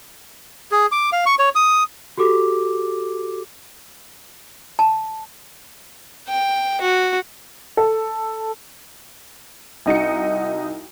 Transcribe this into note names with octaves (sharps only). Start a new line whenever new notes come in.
G#4
D6
F5
C#6
C#5
D#6
F#4 G4 A4 D6
A5
G5
F#4
A4
C2 D#4 F#4 C#7